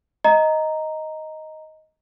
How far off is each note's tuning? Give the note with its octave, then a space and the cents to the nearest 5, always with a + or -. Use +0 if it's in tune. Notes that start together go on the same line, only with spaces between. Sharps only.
D#5 +10 A#5 -5